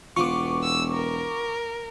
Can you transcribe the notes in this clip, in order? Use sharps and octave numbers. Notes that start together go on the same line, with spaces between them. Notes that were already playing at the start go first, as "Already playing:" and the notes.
E1 B3 F4 C#6 D6
E6
A#4